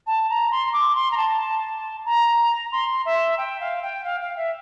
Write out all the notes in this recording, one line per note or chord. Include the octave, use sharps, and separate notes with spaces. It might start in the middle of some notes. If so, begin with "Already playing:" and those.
A5
A#5
C6
D6
C6
A#5
A5
A#5
C6
E5
G5
F5
G5
F5
F5
E5